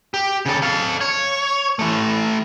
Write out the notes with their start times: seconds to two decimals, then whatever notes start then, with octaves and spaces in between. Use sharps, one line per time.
0.14 G4
0.46 C#3 A4
0.62 A4 F5
1.01 C#5
1.79 E3 A3